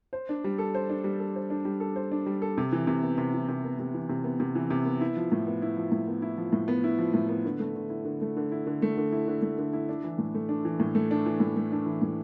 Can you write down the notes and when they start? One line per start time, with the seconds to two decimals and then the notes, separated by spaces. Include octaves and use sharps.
0.13 C5
0.29 D4
0.44 G3
0.58 A4
0.75 C5
0.89 D4
1.04 G3
1.20 A4
1.36 C5
1.50 D4
1.65 G3
1.80 A4
1.96 C5
2.12 D4
2.26 G3
2.42 A4
2.58 C3
2.72 E3
2.87 C3
3.03 B3
3.18 C3
3.33 E3
3.48 C3
3.64 B3
3.79 C3
3.94 E3
4.09 C3
4.24 B3
4.40 C3
4.55 E3
4.70 C3
4.85 B3
5.01 E4
5.17 F3
5.32 A2
5.47 B3
5.62 E4
5.77 F3
5.92 A2
6.07 B3
6.22 E4
6.38 F3
6.53 A2
6.68 B3
6.84 E4
6.99 F3
7.14 A2
7.29 B3
7.45 D3
7.60 A3
7.76 D3
7.90 E4
8.05 D3
8.21 A3
8.37 D3
8.52 E4
8.67 D3
8.82 A3
8.97 D3
9.12 E4
9.28 D3
9.42 A3
9.58 D3
9.73 E4
9.89 D4
10.04 E3
10.18 A2
10.34 A3
10.49 D4
10.65 E3
10.80 A2
10.95 A3
11.11 D4
11.26 E3
11.40 A2
11.57 A3
11.72 D4
11.86 E3
12.02 A2